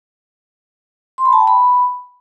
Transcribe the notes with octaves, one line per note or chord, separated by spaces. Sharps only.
C6
B5
A5
G5
B5